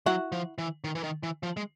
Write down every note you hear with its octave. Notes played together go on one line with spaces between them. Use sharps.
F#3 E4 F#4
F3
E3
D#3
E3
D#3
E3
F3
G#3